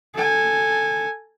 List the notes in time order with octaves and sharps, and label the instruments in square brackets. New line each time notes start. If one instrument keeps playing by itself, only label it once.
[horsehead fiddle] A4 G#5